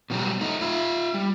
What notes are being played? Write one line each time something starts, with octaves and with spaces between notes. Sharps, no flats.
B2 D#3 F#3 G3
A3 D#4
F4 E5
G3